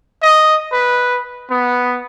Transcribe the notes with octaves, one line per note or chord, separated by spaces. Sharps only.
D#5
B4
B3